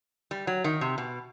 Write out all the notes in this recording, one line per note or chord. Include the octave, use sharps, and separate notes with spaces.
G3
F#3
D#3
C3
B2